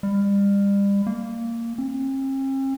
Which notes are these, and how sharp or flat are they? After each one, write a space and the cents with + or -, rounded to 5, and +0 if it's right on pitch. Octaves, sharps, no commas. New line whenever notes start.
G3 +35
A#3 -10
C4 +45